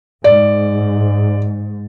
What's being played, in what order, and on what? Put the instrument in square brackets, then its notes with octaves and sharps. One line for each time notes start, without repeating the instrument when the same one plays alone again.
[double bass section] G#2 [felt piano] D5